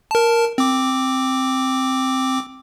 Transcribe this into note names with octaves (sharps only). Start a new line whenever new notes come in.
A#4 A5
C4 D6